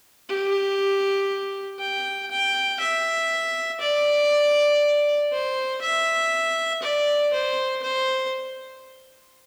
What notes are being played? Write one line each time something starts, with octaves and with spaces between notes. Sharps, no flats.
G4
G5
G5
E5
D5
C5
E5
D5
C5
C5